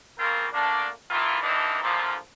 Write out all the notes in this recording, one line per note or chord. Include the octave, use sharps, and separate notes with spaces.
A#1 C#3 A#3 C4 F4 A#4
D3 A3 A#3 D4
A2 D#3 E3 E4 F4
G2 D3 E3 A#3 D4 D#4
G2 A#2 D3 E3 F3